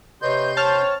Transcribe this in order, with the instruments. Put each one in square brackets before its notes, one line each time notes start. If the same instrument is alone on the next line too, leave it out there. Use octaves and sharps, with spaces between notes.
[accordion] C3 C6 G6 [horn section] B4 C#5 D#5
[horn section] C4 C#5 [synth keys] A5 F6